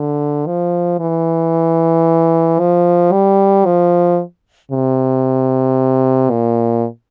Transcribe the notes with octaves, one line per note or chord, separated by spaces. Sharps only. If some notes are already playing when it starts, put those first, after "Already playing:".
Already playing: D3
F3
E3
F3
G3
F3
C3
A#2